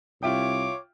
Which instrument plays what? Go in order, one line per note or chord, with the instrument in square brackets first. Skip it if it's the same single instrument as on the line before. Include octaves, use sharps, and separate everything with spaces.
[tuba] C2 [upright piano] F4 E5 G5 [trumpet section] C#5 D6